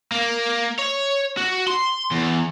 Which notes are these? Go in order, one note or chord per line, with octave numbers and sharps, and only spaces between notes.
A#3
C#5
F#4
C6
E2